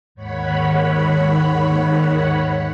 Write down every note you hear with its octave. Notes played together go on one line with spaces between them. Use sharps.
D#2 G#2 D#3 C#5 F#5 B5